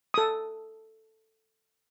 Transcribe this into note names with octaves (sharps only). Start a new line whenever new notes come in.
A4 D#6